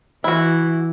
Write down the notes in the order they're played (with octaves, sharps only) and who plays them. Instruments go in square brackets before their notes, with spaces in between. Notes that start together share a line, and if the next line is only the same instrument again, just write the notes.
[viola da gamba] E3 [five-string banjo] E4 F#4